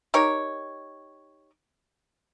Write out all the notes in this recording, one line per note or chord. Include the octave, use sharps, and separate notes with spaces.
D#4 G4 A#4 C#5